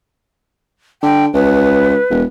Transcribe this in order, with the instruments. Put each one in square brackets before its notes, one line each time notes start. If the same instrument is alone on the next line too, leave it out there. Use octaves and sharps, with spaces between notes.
[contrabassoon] D3 [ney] G5
[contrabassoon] C#2 [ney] B4
[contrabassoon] E1